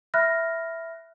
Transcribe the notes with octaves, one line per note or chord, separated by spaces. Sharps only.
E5 B5 F6 F#6 A#6